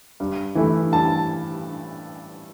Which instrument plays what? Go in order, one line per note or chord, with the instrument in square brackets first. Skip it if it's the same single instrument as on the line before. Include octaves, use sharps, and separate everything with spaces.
[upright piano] G2
E3 A3 E4
G2 A5